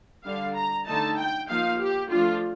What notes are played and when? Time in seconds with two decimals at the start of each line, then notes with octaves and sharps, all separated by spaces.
0.25 D3 G3 D4 F5
0.55 A#5
0.86 D3 A3 D#4 A5
1.18 G5
1.49 F3 A#3 D#4 F5
1.80 G4
2.10 F3 A3 D4 F4